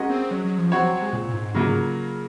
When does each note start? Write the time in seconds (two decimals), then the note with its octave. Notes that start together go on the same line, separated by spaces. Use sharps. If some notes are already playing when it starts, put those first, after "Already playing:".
Already playing: G#3 C#4 F#4 A#4 D#5
0.10 C4
0.31 F#3
0.44 F#3
0.58 F3
0.72 C4 F#4 C#5
0.82 F#3
0.93 F#3
1.02 G#3
1.13 A#2
1.29 A#2
1.34 G#2
1.54 G#2 C#3 F#3 A#3 F4